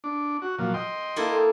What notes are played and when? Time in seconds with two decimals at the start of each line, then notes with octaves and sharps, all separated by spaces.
0.04 D4
0.42 F#4
0.59 A#2 F3 F#3
0.74 D#5 G5 C6
1.16 A#3 E4 A4